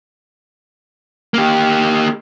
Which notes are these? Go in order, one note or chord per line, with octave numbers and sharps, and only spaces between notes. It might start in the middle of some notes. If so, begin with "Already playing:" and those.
A#3 G4